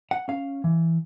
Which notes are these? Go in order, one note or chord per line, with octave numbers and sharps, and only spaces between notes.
F#5
C#4 F5
E3